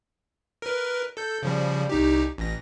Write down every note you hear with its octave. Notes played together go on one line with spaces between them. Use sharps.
A#4 B4
A4 G6
C#3 F3 G3
C2 D#4 G4
A1 A#6